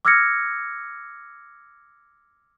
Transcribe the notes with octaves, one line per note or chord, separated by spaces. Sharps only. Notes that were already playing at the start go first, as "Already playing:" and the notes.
D6 E6 F6 G#6 A#6 C#7